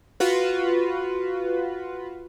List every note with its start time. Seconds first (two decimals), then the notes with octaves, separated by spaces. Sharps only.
0.20 F4 F#4 B4